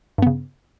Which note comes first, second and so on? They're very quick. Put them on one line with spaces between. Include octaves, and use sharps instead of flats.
G2 B3 C#3